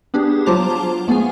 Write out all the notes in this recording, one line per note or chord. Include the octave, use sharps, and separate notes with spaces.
B3 D4 G4 G#4
F#3 F4 C5 A5 D6 F7
A3 B3 F4 G#4 G#5